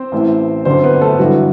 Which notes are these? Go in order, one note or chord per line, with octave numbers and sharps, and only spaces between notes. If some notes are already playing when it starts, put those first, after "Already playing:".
Already playing: C4 C5
A1 A2 E3
G1 F#2 D3 C4 C5
B3 B4
A3 A4
G1 G2 E3 F#3 F#4